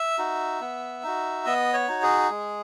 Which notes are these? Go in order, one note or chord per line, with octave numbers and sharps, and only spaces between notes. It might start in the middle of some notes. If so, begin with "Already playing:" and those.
Already playing: E5
D#4 F#4
B3
D#4 F#4
B3 D#5
C#5
D#4 F#4
G#4
G#3